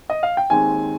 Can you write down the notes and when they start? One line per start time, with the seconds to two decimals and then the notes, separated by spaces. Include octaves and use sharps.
0.10 D#5
0.23 F5
0.37 G5
0.50 D#2 D#3 G#3 C4 G#5